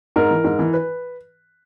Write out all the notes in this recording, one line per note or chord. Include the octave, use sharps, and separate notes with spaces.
G#2 A#4
E3
G#2
E3
B4